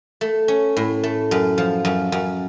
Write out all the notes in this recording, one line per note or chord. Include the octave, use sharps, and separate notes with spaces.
A3
C#4
A2
A3
F#2
F3
F#2
F#2